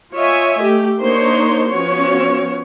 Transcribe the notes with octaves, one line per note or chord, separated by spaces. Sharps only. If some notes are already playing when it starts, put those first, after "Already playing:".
F4 C#5 D#5 E5 G#5
A3 G4
A#3 D4 D#4 C5 C#5 C6
F3 B3 C#4 F#4 C#5